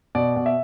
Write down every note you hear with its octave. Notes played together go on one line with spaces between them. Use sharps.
B2 D5
B2
E5